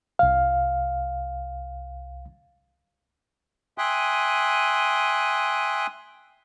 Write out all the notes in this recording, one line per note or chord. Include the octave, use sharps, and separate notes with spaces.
C2 F5
E5 G5 G#5 C6 D#6 F#6